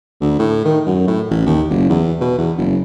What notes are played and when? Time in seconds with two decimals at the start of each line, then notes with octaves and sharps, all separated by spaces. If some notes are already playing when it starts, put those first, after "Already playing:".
0.21 D2
0.39 A2
0.65 D#3
0.86 F#2
1.07 A2
1.30 A1
1.46 D#2
1.70 F#1
1.89 E2
2.21 B2
2.38 E2
2.58 F#1